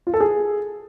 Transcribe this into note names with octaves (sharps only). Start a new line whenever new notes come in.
F4
A4
G#4